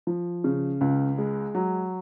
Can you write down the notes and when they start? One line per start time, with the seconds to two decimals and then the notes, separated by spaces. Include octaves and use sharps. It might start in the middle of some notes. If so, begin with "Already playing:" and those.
0.07 F3
0.44 C#3
0.81 C#2
1.18 G#3
1.55 F#3